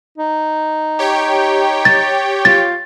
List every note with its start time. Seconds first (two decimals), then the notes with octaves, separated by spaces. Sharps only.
0.18 D#4
0.99 G4 C#5 G5
1.85 A6
2.45 F4 A6